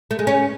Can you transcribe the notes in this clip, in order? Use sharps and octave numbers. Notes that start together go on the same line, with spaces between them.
A3
G#3
C#4